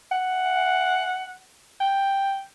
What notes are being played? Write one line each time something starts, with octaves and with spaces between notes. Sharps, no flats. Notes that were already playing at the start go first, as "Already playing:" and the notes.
F#5
G5